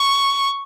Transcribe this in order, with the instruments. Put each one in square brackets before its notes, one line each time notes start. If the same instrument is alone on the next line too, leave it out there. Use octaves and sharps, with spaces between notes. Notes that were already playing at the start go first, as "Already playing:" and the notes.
Already playing: [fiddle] C#6